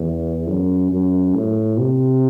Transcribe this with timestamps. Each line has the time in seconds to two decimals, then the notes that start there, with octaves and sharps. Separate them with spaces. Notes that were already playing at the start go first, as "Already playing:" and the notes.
Already playing: E2
0.48 F#2
0.91 F#2
1.35 A2
1.78 C3